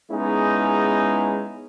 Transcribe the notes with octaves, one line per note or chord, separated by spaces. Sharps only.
G#3 B3 C#4 D#4 E4 G#4